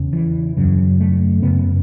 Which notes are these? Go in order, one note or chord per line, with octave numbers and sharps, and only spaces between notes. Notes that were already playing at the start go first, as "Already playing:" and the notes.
Already playing: E2 C#3
E3
F#2 C#3 F#3
A3
F#2 C#3 B3